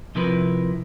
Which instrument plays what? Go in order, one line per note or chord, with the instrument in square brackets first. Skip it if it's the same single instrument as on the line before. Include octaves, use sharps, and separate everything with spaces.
[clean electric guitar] C3 F3 C4 E4 A#4 B4